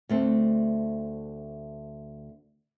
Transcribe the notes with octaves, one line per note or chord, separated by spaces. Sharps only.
D2 A3 C4